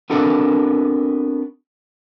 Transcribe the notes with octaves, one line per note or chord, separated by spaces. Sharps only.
B3 C4 D4 F#4 A4 A#4